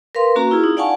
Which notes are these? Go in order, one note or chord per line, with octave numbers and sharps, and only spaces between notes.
A#4 B4 F5 C6
A#3 C#4 F#4 A#5
E4 F4 G#4
D#4
D5 F5 F#5 G#5 A5 C#6